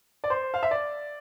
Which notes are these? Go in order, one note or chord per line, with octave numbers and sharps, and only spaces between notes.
D5
C5
F5
E5
D5